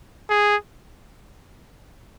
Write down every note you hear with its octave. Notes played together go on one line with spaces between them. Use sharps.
G#4